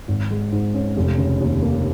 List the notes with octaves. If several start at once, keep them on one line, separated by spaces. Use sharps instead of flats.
G#1
G#3
G#2
C#4
F1
C#3
D#2
A#3